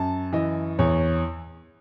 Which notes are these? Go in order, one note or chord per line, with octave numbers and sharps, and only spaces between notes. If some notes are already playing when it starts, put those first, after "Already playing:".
Already playing: F#2 A5
E3 D#5
E2 C#5